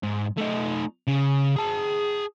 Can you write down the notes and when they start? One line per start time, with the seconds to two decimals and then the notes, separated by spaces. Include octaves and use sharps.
0.03 G#2
0.38 A3 D#4
1.07 C#3
1.56 G#4 A5